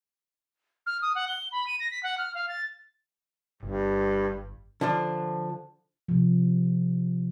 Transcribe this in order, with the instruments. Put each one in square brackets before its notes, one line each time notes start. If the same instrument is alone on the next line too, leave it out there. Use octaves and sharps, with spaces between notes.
[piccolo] F6
D#6
F#5
G7
B5
D#7
A#6
B6
F#5
F6
F5
A6
[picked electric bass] G1 [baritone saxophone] G2
[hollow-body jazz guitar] D3 F3 D4
[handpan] C3 F3